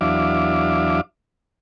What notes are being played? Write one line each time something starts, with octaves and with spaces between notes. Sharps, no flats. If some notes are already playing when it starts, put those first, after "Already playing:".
E2 F#3 D4 E5 F5 D6